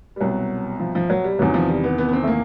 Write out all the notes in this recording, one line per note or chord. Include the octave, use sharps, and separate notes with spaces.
G3
C2 B2 F#3
F3
F3
F#3
G3
E2 C3 D#3 F#3
F3
G3
B3
B3
B3
C4
A3
A#3